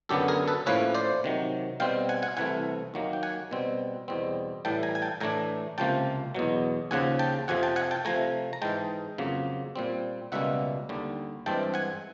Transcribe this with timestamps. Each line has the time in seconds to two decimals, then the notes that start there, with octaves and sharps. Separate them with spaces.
0.09 F#2 D3 F#3 B3 G4 A4
0.28 G#4 A#4
0.48 A4 B4
0.66 A2 F3 A#3 C#4 B4 C#5
0.95 C5 D5
1.24 C3 D#3 F#3
1.80 B2 G3 C4 F5 G5
2.09 F#5 G#5
2.22 F#5 G#5
2.36 C2 C3 E3 A3 F#5 G#5
2.94 D#2 D#3 F#3 A#3
3.13 G5
3.23 F#5 G#5
3.51 B2 G3 C4
4.08 E2 B2 G3 C4
4.65 A2 E3 G3 G5 A5
4.83 G#5 A#5
4.95 G#5
5.02 G5 A5
5.20 A2 E3 A3 D4 G#5 A#5
5.78 C#2 C3 F3 A#3 G5 A5
6.35 E2 B2 F#3
6.91 D#2 C#3 F3 F#5 G#5
7.19 G5 A5
7.48 F2 C3 F3 F#5 G#5
7.63 G5 A5
7.76 F#5 G#5
7.91 G5 A5
8.05 C3 F3 A3 G#5 A#5
8.53 A#5
8.62 G#2 E3 G#3 G5 A5
9.18 F2 C#3 F#3 A#3
9.76 A#2 G3 C4
10.32 C#2 B2 G3 A#3 C#4 E5 F#5
10.89 D#2 D3 G3
11.46 G2 E3 G#3 C4 G5 A5
11.74 F#5 G#5